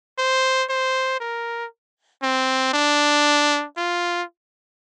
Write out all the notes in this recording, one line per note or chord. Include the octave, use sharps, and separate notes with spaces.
C5
C5
A#4
C4
D4
F4